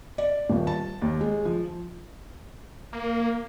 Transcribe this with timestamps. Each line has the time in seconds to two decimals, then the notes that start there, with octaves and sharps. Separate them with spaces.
0.18 D5
0.50 D#1
0.67 A5
1.02 D#2
1.21 G#3
1.45 F3
2.93 A#3